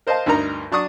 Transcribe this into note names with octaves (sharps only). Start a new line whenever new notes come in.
A#4 C5 D#5 F5 A5
D2 G2 D#4 A#4 A#5
F#3 D4 C#6 D#6